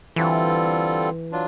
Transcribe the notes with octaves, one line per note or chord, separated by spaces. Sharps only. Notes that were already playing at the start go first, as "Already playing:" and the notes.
D3 E3 G3 C4 F4 A4
F#3 D4 F4